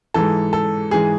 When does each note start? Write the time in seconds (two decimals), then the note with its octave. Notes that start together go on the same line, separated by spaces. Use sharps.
0.14 G#2 E3 A4
0.53 A4
0.91 G#2 E3 G#4